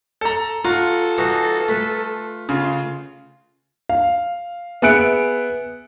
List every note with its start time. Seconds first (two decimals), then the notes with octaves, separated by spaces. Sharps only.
0.21 A4 A#5
0.65 F4 A4 F#5 A#5 C#6
1.18 E3 D#4 F#4
1.69 A3 B4
2.49 C#3 F4
3.89 F5
4.82 B3 G#4 E5 F#6 C#7 D7